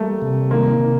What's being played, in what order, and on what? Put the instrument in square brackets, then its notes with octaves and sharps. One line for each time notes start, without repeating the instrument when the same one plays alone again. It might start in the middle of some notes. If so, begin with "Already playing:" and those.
Already playing: [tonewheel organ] G3 [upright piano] A3 A#3
[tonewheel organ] C3
[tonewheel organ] D#3 [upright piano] A#3
[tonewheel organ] C3